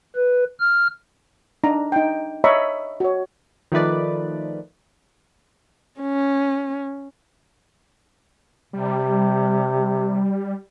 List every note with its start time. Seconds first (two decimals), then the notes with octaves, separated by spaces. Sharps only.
0.16 B4
0.60 F6
1.64 D4 D#4 A#5
1.92 D#4 G5
2.44 C#5 D#5 E5 A#5 B5 C#6
3.00 F#4 C#5
3.72 D#3 F3 A3 B4 D5
6.00 C#4
8.73 C3 G3